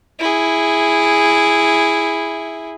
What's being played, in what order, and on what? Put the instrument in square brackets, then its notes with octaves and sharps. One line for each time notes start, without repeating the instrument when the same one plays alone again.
[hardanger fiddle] E4 G#4